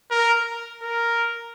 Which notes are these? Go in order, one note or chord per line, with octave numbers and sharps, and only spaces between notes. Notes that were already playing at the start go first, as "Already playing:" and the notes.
A#4
A#4